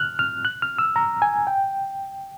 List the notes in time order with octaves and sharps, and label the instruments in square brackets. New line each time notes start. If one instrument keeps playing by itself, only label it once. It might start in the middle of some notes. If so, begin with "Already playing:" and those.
Already playing: [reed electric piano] F6 F#6
F6
F#6
F6
E6
A#5
G#5
G5